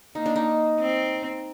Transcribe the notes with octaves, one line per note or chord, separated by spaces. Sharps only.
A#3 D#4
D4
D#4
C4